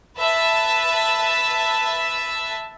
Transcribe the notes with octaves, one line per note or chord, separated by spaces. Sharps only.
B4 E5 A5